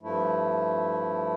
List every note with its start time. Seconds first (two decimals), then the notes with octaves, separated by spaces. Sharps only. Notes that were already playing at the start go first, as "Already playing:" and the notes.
0.01 G2 F3 A3 E4